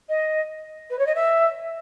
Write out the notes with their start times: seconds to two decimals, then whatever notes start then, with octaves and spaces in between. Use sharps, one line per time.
0.09 D#5
0.90 B4
0.99 C#5
1.06 D#5
1.15 E5